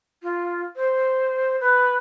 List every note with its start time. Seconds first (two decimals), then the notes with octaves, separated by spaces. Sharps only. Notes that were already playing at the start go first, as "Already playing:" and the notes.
0.23 F4
0.76 C5
1.60 B4